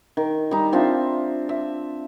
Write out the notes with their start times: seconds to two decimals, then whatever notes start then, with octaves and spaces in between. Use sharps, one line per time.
0.17 D#3
0.51 G3 D#4
0.73 C4 D4 F4 E5
1.49 E5